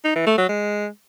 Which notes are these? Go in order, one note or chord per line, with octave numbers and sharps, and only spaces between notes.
D#4
E3
A3
F#3
G#3